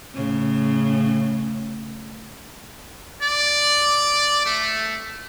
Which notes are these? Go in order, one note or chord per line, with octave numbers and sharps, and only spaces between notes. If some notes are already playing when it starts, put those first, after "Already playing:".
A2 C#3
D5
A3